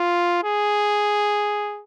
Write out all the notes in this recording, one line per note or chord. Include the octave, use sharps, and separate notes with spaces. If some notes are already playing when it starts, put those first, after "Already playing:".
Already playing: F4
G#4